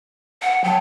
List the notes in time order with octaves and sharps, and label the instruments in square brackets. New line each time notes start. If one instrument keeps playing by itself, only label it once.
[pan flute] F#5
[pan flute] F#3 [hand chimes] G5 A5